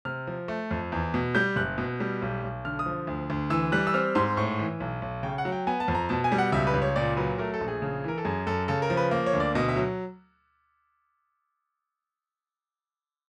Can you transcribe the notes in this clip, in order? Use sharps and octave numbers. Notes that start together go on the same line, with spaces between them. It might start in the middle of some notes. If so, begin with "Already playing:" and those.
C3 F6
F3
A3
F2
E2
B2
G3 G6
F#1 F#6
B2
G3
B1
B1
D3 F6
D#6
F3
D2
D2
E3 E6
G3 F#6
E6
C4 F6
G#2 C6
A2 C#6
E3
B1
B1
C#3 G5
F#5
F#3
G5
B3 G#5
A5
F2
A#5
B2 A5
G#5
G3
F#5
C#2 E5
B4
C#2
C#5
A#2 D5
F#3 B4
A3 A#4
A4
A#1
G#4
C#3
E3 A#4
A4
F#2 G#4
F#2 A4
C#3 A4
A#4
F3
B4
A#3
C#5
D2
D5
B2 D#5
E5
F#3